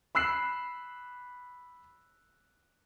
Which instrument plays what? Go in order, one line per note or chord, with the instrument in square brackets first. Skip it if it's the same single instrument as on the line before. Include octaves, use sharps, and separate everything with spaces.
[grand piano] B5 E6 F#6 C7